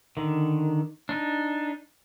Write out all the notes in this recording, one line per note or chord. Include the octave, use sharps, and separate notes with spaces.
D3 D#3
D4 D#4